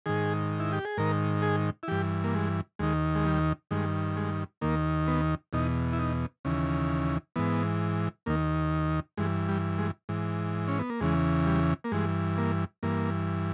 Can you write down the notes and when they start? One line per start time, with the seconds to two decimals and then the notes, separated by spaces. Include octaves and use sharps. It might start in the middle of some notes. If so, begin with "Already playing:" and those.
0.06 G#2 D#3 G#4
0.60 E4
0.73 G4
0.85 G#4
0.97 G#2 D#3 A#4
1.42 G#4
1.83 E4
1.88 G2 E3 G4
2.24 A#3
2.35 G#3
2.79 D#2 D#3 G#3
3.15 G#3
3.25 G3
3.71 G2 D#3 G#3
4.17 G#3
4.61 D#2 D#3 A#3
5.08 B3
5.53 E2 B2 D#4
5.93 E4
5.99 D#4
6.45 D#2 C#3 E3
7.36 G#2 E3 B3
8.26 D#2 D#3 A#3
9.17 G2 E3 G#3
9.49 G3
9.78 G#3
10.09 G#2 E3
10.68 C#4
10.79 B3
10.90 A#3
11.00 E2 C#3 E3 G#3
11.46 G3
11.84 A#3
11.92 G2 E3 G#3
12.38 A#3
12.83 G2 E3 A#3